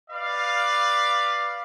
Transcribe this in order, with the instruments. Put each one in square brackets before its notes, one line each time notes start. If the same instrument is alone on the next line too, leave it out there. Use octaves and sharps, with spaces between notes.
[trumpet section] B4 D5 F5